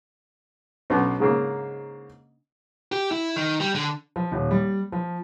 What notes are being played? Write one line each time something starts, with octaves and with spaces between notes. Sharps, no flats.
B1 B2 C#4 D4
G#2 C#3 A#3
G4
E4
D#3
G3
D3
F3
D#1
G3
F3